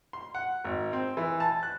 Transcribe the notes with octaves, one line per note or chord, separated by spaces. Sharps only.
C6
F#5
G#1
C4
E3
A5
F#6